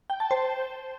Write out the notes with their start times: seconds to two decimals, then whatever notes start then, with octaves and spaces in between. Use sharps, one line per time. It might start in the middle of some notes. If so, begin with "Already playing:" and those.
0.10 G5
0.20 A5
0.31 C5